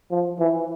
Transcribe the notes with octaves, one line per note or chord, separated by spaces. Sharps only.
F3
E3